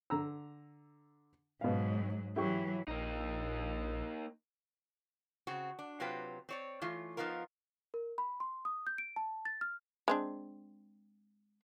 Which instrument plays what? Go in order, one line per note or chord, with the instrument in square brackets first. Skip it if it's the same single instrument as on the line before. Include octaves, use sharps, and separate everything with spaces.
[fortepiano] D3 A#5 E6
[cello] G#2 F#3 [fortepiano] B2 F5
[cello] E3 F#3 [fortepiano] E4 G4 C#6
[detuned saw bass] A#1 [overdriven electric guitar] A#3 D#4
[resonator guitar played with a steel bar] C#3 C4 F#4
D4
C3 F#3 C4 F4 B4 G5
C4 C#5 D5
E3 A3 F4
F3 B3 D#4 F4 A#4
[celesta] A#4
B5
C6
D#6
G6
D7
A5
A6
F6
[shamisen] G#3 C4 D4